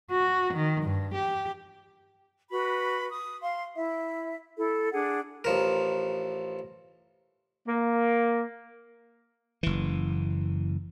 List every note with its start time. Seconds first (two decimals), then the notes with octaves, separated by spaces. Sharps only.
0.11 F#4
0.54 D#3
0.84 G2
1.15 G4
2.51 F#4 B4 B5
3.10 D#6
3.40 F5 C6
3.75 E4 E5
4.58 E4 A4
4.91 D4 G#4 F#5
5.44 A1 F3 A#4
7.67 A#3
9.63 F#1 E3